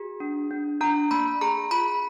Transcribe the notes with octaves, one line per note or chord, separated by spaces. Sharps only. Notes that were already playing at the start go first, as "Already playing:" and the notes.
Already playing: F#4 G#4
D4
D4
D4 A#5
A#3 B5
G#4 A#5
F4 B5